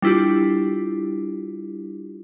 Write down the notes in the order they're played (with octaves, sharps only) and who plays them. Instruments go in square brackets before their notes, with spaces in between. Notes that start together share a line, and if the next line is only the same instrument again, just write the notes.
[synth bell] G3 D4 E4 F4 G4